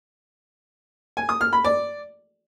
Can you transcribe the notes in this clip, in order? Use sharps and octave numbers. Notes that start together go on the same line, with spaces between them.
G#5
D#6
F6
B5
D5